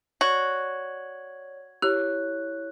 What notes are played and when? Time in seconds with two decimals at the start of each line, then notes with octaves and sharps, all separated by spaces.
0.21 F#4 C#5 D5 G#6
1.82 E4 G4 C#5 F#6